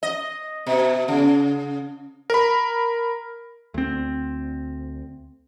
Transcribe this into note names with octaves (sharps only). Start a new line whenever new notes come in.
D#5
B2
C#3
A#4 B5
D2 C4